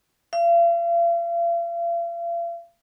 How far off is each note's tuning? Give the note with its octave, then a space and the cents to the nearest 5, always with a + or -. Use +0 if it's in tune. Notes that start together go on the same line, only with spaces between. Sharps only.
F5 -40